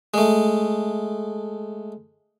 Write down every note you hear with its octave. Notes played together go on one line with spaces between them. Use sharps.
G#3 A3